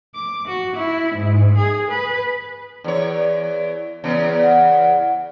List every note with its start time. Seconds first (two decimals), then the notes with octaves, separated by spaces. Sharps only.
0.16 D6
0.48 F#4
0.76 E4
1.16 G#2
1.57 G#4
1.90 B4
2.84 E2 C#5
4.04 E2 C#3 B3
4.42 F#5